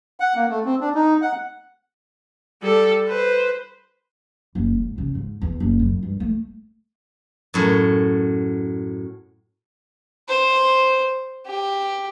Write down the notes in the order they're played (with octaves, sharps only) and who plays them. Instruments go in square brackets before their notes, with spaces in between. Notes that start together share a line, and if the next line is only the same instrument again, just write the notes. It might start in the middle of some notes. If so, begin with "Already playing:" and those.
[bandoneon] F#5
A#3
A3
C4
D4
D#4
F#5
[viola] G3 A4
B4 C5
[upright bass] F#1
G#2
C#3
G#2
E2
F#1
F#2
G2
A3
[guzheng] F#2 A2
[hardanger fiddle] C5
G4